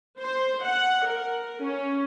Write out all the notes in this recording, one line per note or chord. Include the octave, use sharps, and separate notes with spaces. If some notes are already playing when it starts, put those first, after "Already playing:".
C5
F#5
A#4
C#4